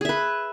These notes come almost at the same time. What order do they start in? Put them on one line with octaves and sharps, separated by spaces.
G#4 E5 B4